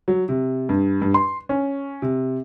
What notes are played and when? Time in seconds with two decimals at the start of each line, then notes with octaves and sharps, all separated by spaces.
0.08 F#3
0.29 C3
0.69 G2
1.02 G2
1.14 C6
1.49 C#4
2.02 C3